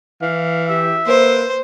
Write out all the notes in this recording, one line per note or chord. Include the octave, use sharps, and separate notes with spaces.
E3 F5
G4 E5
A#3 B4 C5